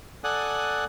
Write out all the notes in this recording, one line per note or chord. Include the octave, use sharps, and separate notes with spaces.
A4 D5 F#5 G#5 D#6 F#6